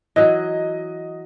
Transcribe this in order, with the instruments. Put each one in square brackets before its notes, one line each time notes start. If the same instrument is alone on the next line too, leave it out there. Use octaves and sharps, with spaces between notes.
[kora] E3 F#3 [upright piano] D#5